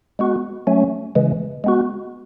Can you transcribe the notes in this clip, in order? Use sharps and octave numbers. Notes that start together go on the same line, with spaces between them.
G#3 B3 F#4
F#3 A3 C#4
C#3 E3 G#3
G#3 B3 F#4